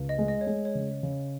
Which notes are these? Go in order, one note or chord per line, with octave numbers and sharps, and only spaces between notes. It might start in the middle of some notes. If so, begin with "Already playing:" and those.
Already playing: C#2
D#5
G#3
D#5
C#5
G#3
C#5
C#3
C#3